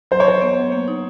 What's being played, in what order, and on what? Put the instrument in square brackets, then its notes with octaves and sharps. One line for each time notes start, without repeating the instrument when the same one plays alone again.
[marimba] F#3 [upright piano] C5
[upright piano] C#5
[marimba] F#3 [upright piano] C5
[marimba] B3
F#3
A#3
D#4